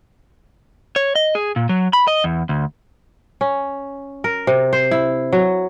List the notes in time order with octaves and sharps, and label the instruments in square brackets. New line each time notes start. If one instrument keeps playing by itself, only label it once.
[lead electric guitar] C#5
D#5
G#4
A#2
F#3
B5
D#5
E2
D2
[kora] C#4
A#4
C3
C5
E4
F#3